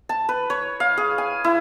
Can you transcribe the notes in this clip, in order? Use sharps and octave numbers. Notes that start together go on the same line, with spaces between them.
A5
B4
C#5
F5
G#4
G#5
E4